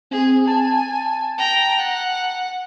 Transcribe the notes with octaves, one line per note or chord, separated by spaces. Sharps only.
C4 G#4
G#5 A5
G5 A#5
F#5